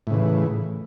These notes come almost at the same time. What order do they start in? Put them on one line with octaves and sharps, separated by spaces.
A2 C#3 E3